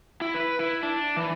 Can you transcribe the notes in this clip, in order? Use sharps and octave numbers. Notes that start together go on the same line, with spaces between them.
E4
B4
E4
D4
E3